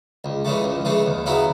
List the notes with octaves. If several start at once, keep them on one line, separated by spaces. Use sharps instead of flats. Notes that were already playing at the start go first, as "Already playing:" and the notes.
C#2
C#3 E3 A3
C#2
C#3 E3 A3
D#2
C#3 F#3 B3 E4